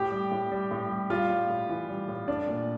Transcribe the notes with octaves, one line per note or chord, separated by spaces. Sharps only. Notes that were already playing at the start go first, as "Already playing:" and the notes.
Already playing: A2 G4 G5
G3
A2
G3
A2
G3
G3 F4 F5
A2
A2
E3
G3
A2
A3 D4 D5
A#2